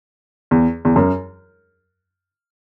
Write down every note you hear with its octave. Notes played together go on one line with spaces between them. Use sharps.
E2
E2
F#2